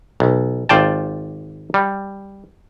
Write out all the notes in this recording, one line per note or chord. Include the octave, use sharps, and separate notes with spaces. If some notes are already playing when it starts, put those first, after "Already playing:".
B1
G#1 F4 D5 G5 A5
G3